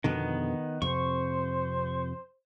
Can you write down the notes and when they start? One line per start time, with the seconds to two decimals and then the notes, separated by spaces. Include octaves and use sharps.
0.04 F2 B2 D3 D#3 B3
0.82 F2 C3 C5 C#6